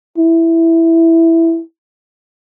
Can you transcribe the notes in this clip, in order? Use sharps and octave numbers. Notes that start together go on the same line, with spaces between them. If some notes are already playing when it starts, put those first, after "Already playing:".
E4